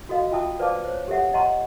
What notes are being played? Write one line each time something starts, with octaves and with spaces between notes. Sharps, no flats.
F#4 A4 D#5 F5
F4 E5 G5 A5 D#6
B4 C5 D5 F5 A5 D6
C5 C#5
G4 A4 C#5 E5 F#5
D#5 F#5 A#5 C6 C#6